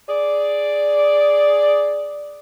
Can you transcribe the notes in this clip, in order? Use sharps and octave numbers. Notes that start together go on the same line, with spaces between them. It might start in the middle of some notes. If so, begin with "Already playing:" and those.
G#4 D5